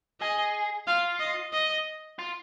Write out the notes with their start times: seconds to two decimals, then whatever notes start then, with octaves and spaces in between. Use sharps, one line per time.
0.21 G#4 D#5
0.87 F4 F5
1.19 D#5
1.53 D#5
2.19 F4